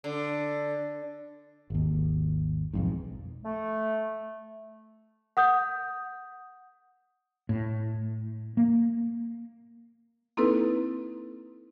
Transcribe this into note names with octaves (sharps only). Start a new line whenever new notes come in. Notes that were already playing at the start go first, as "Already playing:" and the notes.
D3
G#1 D#2
B1 F2 G#2
A3
F#5 D#6 G6
A2
A#3
A#3 C4 D#4 E4 A4 B4